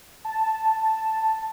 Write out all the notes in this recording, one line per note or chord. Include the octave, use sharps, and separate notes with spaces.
A5